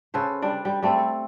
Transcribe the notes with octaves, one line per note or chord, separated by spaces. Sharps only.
C#3 A4 B4 C5
G3 D4 D5
G3
G3 A3 C4 A4
A4